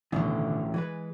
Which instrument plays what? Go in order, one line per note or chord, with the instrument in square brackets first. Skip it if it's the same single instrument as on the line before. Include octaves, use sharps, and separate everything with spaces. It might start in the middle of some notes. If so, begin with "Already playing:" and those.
[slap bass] A1 D2 [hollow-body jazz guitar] B2 D3 D#3
[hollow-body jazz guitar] E3 G#3 B4